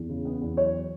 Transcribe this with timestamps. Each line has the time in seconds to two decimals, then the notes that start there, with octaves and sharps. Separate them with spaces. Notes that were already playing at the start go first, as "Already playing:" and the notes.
Already playing: E2
0.09 C#3
0.25 B3
0.41 E2
0.57 F#3 C#5